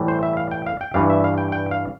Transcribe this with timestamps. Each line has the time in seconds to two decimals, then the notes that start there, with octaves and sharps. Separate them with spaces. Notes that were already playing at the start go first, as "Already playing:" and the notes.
Already playing: A2 E3 G3
0.08 C5
0.23 E5
0.37 F5
0.51 G5
0.66 F5
0.81 G5
0.94 G2 E3 G3 F5
1.10 E5
1.24 F5
1.38 G5
1.52 G5
1.71 F5